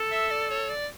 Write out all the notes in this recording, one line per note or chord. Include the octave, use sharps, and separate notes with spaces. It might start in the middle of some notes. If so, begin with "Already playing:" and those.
Already playing: A4
E5
D5
C#5
D5